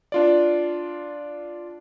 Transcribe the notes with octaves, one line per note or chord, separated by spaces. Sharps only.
D4 F4 D5